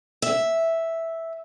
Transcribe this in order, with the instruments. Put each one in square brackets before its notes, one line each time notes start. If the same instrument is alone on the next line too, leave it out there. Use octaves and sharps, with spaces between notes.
[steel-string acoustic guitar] E5